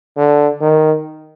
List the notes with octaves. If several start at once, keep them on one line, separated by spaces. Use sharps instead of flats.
D3
D#3